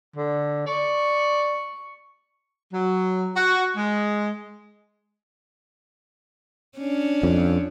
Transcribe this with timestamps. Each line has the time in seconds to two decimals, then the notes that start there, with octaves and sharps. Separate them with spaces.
0.16 D3
0.66 D5 C#6
2.73 F#3
3.36 F#4
3.77 G#3
6.79 C#4 D4
7.23 F2